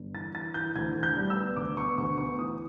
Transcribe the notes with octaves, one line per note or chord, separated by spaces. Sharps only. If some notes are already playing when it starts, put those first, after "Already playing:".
Already playing: G1
E3 A6
E3 A6
E3 G6
D2 G#6
D2
G6
G3
E6
B3
D2 D6
B3 C#6
D2 C#6
B3 C#6
E3 D#6